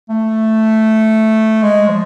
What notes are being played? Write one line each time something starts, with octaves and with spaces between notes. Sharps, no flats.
A3
G#3
F3